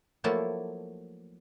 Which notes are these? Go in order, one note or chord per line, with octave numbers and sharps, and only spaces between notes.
F3 F#3 A3 A#3 E4 A5